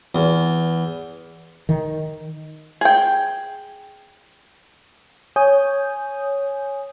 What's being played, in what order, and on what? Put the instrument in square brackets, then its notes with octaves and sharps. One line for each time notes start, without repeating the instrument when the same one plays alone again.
[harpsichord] E2
[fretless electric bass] D#3
[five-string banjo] G#4 G5
[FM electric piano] C#5 G#5 D#6 G6